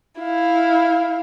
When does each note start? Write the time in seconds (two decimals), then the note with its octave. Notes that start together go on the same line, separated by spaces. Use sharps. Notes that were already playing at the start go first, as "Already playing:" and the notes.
0.19 E4 F5